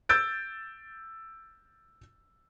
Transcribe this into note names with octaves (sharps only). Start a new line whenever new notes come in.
E6 G6 A6 D7